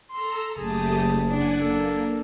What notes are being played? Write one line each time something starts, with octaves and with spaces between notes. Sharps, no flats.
A4 A#5 C6 E6
F#1 A3 G4 G#4 A5 D#6
D4 D5 F#5 G#5
A#3 A4